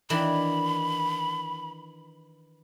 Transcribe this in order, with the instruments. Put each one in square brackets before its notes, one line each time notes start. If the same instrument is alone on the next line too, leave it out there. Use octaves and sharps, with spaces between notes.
[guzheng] D#3 E3 D4 [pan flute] B5